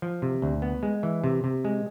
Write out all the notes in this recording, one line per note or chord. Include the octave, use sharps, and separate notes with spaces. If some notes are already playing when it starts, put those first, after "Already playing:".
F3
C3
D2
B3
G#3
E3
C3
C3
G#3